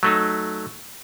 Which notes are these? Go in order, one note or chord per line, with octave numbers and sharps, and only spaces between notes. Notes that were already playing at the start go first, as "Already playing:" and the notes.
F#3 A3 D#4